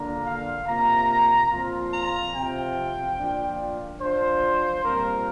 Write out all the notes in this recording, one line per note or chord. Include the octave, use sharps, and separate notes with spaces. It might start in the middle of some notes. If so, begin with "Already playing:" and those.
Already playing: D3 A#3 D4 F4 A#5
F5
C3 A#3 F4 A#5
A#2 F3 C4 F4
A#5
C3 F3 C4 F4 G5
A#2 F3 D4 F4
F3 D4 F4 C5
A#2 G3 C4 F4 A#4